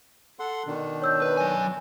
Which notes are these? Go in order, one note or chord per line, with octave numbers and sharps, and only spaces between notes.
A4 F#5 C6
B2 D#3 D4
C#5 E6 G6
B4
F#3 G#5